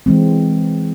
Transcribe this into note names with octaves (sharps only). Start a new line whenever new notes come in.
E3 G#3 C4